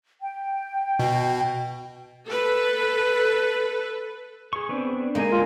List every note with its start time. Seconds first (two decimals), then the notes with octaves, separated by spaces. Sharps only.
0.22 G5
0.99 B2
2.26 A4 B4
4.53 G#4 C#6
4.69 B3 C4 D4
5.15 D3 G#3 A#3 D#4 G#5
5.32 F4